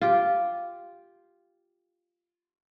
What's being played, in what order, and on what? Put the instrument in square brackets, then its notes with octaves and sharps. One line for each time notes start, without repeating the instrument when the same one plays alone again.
[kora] F4 G4